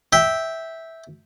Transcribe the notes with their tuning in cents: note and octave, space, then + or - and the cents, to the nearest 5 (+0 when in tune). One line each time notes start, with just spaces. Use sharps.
E5 -10 G5 +0